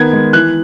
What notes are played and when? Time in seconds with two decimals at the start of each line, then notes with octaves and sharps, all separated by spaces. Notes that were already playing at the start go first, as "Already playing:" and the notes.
Already playing: D#3 B3 G#6
0.13 G#3
0.33 E3 F#6